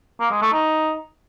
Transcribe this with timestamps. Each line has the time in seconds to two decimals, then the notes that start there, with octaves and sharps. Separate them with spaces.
0.20 A#3
0.31 G#3
0.42 A3
0.53 D#4